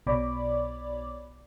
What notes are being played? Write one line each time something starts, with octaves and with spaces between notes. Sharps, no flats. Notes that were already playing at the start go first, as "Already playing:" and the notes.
B1 B2 C#5 D5 B5 D6